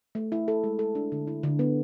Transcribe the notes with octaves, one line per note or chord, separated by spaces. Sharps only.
A3
E4
A4
G#3
A4
D4
D3
E4
D3
B3